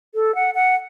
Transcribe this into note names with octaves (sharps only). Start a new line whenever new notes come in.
A4
F#5
F#5